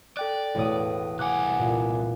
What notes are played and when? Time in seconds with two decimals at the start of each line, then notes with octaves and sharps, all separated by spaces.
0.17 A4 D5 G5 F#6
0.55 E1 A2 F#4 C#5 D#6
1.19 C2 F#5 G#5 D6 F#6
1.59 A#2